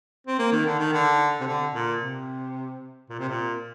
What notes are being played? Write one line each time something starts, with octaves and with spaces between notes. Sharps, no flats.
C4
A#3
D#3
D3
D#3
D3
C3
D3
A#2
C3
A#2
C3
A#2